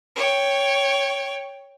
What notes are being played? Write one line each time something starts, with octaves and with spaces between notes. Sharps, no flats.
C#5 G5